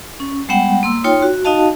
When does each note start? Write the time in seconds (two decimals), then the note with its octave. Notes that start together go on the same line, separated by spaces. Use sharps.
0.20 C#4
0.49 G3 G#3 B3 F#5 G5
0.83 A#3 C6 E6
1.04 D#4 F4 C#5 G5 C6
1.22 F#4
1.45 D#4 F#4 D#5 F5 A5